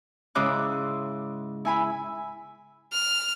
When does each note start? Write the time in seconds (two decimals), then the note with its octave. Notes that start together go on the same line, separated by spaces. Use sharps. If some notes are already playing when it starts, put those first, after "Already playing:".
0.35 G#2 C#3 G#3 E4 D6 F#6
1.65 E4 G#5 B5
2.92 F6